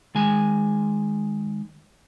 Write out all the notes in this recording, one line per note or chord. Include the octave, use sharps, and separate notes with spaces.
D#3 G#3 G#5